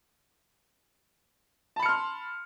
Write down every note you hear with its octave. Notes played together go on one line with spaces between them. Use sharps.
A5 B5 C6 F6 C#7